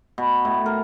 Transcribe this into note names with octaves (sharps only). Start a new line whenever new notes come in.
B2
A2
A#4